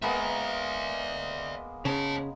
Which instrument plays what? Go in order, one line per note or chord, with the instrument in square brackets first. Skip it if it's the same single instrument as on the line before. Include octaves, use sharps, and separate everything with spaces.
[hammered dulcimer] G#3 A#3 B3 [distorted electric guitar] D5 E5
[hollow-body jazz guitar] C#3 [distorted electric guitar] C#5 A5